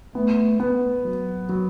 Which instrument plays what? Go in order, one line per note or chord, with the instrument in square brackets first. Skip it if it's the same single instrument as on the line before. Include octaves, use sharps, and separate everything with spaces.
[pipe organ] A3 [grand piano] B3
[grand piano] B3
F#3
F#3